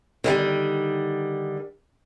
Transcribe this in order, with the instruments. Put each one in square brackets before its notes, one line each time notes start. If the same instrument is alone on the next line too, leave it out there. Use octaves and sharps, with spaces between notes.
[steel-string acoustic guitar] D3 D#3 G3